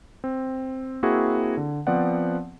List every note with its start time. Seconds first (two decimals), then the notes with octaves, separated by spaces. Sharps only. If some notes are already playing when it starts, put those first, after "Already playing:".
0.24 C4
1.03 A#3 C4 E4 F#4 G#4
1.57 D3
1.87 F3 B3 C4 D5 F#5